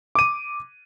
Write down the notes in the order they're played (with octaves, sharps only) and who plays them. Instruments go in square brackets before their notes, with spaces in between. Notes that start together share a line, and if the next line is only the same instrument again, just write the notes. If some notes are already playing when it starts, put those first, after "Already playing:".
[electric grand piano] D6 D#7